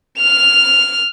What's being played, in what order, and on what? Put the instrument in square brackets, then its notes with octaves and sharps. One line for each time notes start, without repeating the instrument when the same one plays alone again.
[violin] F6 F7